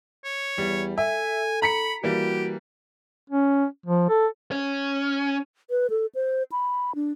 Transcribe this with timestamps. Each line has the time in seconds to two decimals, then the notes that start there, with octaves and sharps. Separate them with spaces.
0.25 C#5
0.58 E2 G3
0.98 A4 E5 G#5
1.62 A#5 B5 B6 C#7
2.03 E3 G3 A#3 F#4 G4
3.30 C#4
3.86 F3
4.09 A4
4.52 C#4
5.70 B4
5.90 A4
6.15 C5
6.52 B5
6.95 D4